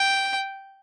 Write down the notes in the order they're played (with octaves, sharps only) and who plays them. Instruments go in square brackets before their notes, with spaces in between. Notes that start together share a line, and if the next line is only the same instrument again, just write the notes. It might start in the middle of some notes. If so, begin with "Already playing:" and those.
Already playing: [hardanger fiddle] G5